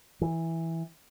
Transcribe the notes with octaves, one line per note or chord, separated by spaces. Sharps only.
E3